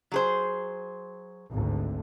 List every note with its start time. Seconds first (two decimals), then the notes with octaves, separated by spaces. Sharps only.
0.12 F#3 G#4 C5
1.50 G#1 D2